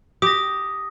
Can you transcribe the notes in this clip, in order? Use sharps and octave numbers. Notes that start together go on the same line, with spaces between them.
G4 D#6 A#6